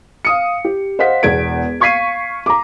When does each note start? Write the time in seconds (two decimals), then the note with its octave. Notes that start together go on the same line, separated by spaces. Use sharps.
0.25 F5 D#6 C#7
0.65 G4
0.99 C5 D#5 F5 F#5 B6
1.23 E1 E2 G#6 D7
1.80 F5 C#6 G#6 B6 C7 D#7
2.46 A#5 D6